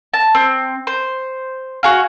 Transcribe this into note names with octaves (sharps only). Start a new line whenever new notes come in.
A5
C4
C5
F#4 G#4 F5